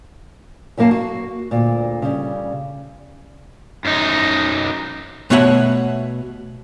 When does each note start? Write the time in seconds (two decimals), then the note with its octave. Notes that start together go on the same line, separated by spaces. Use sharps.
0.77 F#2 F#3 A#3 F5 A5
0.91 F#4
1.51 D2 A#2
2.02 C#3 G3
3.85 F#2 D#4
5.30 B2 A3 B3 C#5 E5 F#5